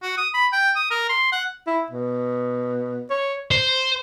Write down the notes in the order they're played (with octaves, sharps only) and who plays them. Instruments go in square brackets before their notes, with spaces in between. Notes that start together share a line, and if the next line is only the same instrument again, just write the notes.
[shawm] F#4
D#6
B5
G5
D#6
A#4
C6
F#5
[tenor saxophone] E4
B2
C#5
[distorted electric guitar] C5